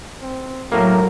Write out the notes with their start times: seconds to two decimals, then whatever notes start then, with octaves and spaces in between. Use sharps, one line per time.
0.22 C4
0.72 A2 F#3 A#3 A#4